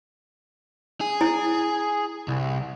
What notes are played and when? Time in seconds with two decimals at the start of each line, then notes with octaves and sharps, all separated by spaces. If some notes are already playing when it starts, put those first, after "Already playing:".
1.01 G#4
1.21 E4
2.28 C2